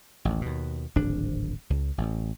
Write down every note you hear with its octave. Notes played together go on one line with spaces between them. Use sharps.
A1 D#2
D#2 B2
D1 G#1 F3 D4
C#2
A1